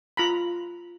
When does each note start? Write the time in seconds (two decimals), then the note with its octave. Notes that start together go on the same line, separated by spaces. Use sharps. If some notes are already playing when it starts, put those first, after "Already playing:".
0.17 F4 A#5 B5